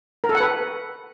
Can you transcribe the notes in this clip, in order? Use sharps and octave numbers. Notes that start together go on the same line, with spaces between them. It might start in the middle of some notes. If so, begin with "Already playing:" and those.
A#4
A4
F#5
B4